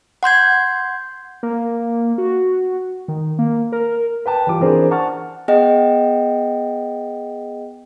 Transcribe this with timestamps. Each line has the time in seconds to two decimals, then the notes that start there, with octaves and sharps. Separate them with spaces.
0.23 F#5 C6 G6 G#6
1.43 A#3
2.18 F#4
3.08 D#3
3.39 A#3
3.72 A#4
4.26 B4 G5 A5
4.47 E3 G3 F4 D6
4.61 E3 C4 D4 G#4 A#4 C5
4.91 F#5 A5 C#6 F6 A6
5.48 B3 G#4 D#5 F#5 G5